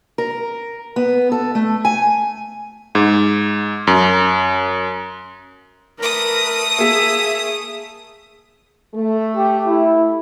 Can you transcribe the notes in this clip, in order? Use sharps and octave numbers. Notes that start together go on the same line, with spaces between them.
A#4
B3
A4
A3
G#5
G#2
F#2
A3 A#4 B4 D#6
A#3 G#4 E5
A3
G4
E4